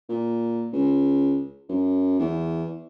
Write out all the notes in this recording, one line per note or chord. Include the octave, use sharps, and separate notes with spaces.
A#2
C#2
F#2
E2